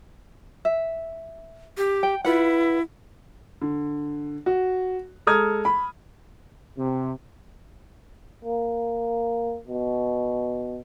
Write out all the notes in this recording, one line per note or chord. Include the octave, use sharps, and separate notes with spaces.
E5
G4
G5
E4 F4 B4 F#5
D3
F#4
G#3 A4 A#5 D#6 F6 G#6
B5
C3
A#3
B2